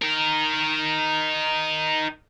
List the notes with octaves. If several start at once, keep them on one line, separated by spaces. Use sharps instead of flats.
D#4 A#4